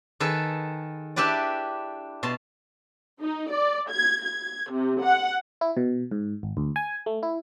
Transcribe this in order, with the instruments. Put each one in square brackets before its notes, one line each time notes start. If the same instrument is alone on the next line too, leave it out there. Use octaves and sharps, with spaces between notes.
[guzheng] D#3 G#4 A4 B4
D4 E4 G4 B4 D5
B2 A5 C6
[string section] D#4
D5
G#6
G#6
C3
F#5
[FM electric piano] E4
B2
G#2
G#1
D2
G#5
A3
E4